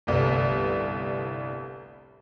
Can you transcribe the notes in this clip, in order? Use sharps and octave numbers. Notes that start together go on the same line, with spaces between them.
G1 C2 A2 B3